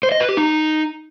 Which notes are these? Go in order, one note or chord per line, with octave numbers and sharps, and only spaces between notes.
C5
D#5
B4
G4
D#4